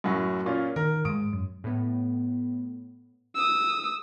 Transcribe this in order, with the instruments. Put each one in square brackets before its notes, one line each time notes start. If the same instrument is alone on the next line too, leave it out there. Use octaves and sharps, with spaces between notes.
[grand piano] F#2 A2 F#3
A#2 C#4 F4
[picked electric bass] D#3 [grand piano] A#4
[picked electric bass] G#2 G#3 [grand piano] D#6 D7
[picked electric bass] F#2
[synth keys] A2 B3
[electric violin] D#6 E6